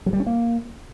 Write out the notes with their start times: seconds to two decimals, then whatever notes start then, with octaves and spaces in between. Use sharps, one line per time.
0.06 F#3
0.13 G3
0.20 C#4
0.27 A#3